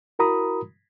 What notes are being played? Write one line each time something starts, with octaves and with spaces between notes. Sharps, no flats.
E4 F#4 A#4 A#5 B5 D#6